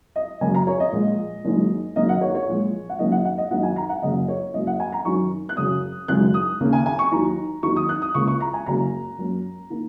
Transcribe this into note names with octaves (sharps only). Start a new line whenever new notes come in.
D#5
F#2 C#3 A#3 G#5
A#5
C#5
D#5
A#1 A#2 G#3
F#1 F#2 D#3 G#3
F#1 F#2 D#3 A#3 D#5
F#5
C#5
C#5
A#1 A#2 G#3
F#5
F#1 F#2 D#3 A#3 C#4 D#5
F#5
F#5
D#5
F#2 D#3 A#3 D#4 F#5
G#5
A#5
F#5
F#1 F#2 C#3 F#3 A#3 D#5
C#5
F#1 F#2 F#3 D#5
F#5
G#5
A#5
F#2 D#3 F#3 C#4 C#6
F#6
F#2 C#3 F#3 C#4 D#6
G#1 F#2 C#3 G#3 D#4 F#6
D#6
D#2 C#3 A#3 C#4
G#5
G#5
C#6
D#2 D#3 F#3 A#3 D#4 A#5
D#2 D#3 F#3 A#3 D#4 C#6
D#6
F#6
D#6
C#2 C#3 A#3 C#6
C#6
A#5
G#5
F#1 F#2 C#3 F#3 C#4 A#5
F#2 F#3 A#3 C#4
D#3 A#3